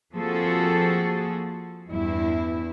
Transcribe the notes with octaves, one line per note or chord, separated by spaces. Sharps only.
F3 A#3 C4 F#4 G#4 A4
E2 G2 E4